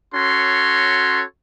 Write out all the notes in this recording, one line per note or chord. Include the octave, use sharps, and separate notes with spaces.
C#4 F#4 A4 C#5 C6